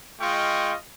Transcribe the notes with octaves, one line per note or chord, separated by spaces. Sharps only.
G#3 F4 D#5 F5 G5 C#6